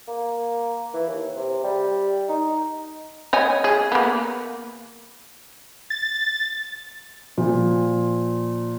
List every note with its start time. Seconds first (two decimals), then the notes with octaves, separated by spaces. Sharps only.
0.07 A#3
0.94 E3
1.07 D#2
1.36 C3
1.64 G3
2.28 D#4
3.33 C#5 D#5 G#5
3.64 G#4
3.92 A#3 B3
5.90 A6
7.38 A#2 F3